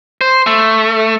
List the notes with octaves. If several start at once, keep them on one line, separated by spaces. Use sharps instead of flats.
C5
A3